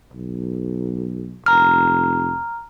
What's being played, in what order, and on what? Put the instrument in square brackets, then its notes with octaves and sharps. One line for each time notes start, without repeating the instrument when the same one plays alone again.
[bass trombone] B1
[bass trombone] F1 [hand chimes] A#5 F6